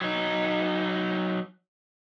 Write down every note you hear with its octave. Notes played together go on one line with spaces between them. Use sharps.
F#3 D#4